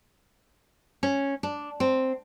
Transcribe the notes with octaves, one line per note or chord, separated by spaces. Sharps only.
C#4
D4
C4